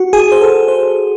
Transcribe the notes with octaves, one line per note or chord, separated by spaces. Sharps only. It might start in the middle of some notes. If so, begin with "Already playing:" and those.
Already playing: F#4
G#4
C5
A4
A4
C5